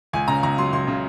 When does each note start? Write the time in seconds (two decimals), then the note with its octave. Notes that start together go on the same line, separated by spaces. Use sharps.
0.13 C#2 G#5
0.28 C#3 A#5
0.43 C#2 A#5
0.58 F#3 C6
0.73 C#2 C6
0.87 C#3